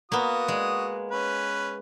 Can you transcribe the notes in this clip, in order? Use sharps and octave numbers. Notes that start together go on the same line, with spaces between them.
A#3 B3 F#4 D#6
G#3
C#4 B4